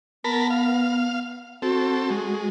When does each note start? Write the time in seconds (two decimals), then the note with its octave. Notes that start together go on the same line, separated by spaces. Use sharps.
0.24 B3 A#4 A5 B5
0.50 F5
1.62 C4 F#4 A4
2.10 G#3